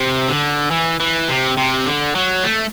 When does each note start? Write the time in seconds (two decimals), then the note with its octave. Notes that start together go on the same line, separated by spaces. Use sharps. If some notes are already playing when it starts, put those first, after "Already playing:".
Already playing: C3
0.28 D3
0.71 E3
1.00 E3
1.29 C3
1.58 C3
1.86 D3
2.15 F#3
2.44 A3